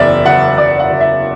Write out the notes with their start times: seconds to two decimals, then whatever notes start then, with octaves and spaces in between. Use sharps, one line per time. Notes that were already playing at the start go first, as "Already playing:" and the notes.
Already playing: F#1 E2 D5 E5
0.25 F#1 F#5
0.58 F#1 D5
0.80 F#5
0.90 F#1
1.01 E5